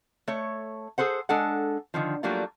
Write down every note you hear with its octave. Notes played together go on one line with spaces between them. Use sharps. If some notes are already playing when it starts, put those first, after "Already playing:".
A3 C#5
G#4 A4 C5 F#5
G#3 D4 A4 F#5
D3 D#3 F3
F#3 G3 A3 A#3 D4 F4